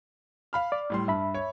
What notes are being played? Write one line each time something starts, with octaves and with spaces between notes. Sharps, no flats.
F5 B5 F6
D5
A2 G3 C6
G2 E5 B5
C#5